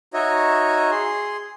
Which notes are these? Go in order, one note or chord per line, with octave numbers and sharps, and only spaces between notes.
D#4 F#4 C#5 D#5 E5
G#4 C6